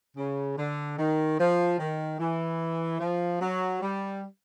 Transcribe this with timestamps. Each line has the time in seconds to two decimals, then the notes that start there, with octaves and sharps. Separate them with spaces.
0.17 C#3
0.57 D3
0.98 D#3
1.39 F3
1.79 D#3
2.19 E3
3.00 F3
3.41 F#3
3.82 G3